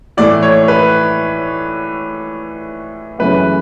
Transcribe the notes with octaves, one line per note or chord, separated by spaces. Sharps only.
A2 E3 A3 D5
C#5
B4
F#2 C#3 E3 A3 B4